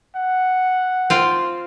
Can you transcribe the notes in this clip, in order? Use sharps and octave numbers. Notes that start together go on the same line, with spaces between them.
F#5
C4 F4